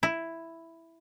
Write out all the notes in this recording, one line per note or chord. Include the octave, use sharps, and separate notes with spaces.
E4